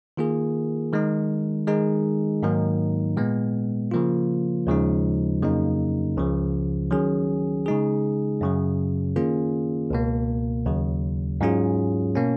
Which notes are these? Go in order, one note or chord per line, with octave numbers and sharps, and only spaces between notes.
D#3 A#3 F4 G#4
D#3 G#3 D#4
D#3 G#3 D#4 G#4
G#2 D#3 F#3 A#3 D#4
A#2 G#3 B3
C#3 F3 A#3 F4
D#2 C#3 F3 G#3 D#4
F2 C#3 F#3 A#3 D#4
C#2 C#3 F3
D#3 F#3 C#4 G#4
C#3 G#3 D#4 G#4
F#2 C#3 F#3
D#3 A#3 C#4 F4 G#4
C#2 B2 A#3
D#2 C#3 F#3
G#2 F#3 C#4 F4 G#4
B2 A#3 C#4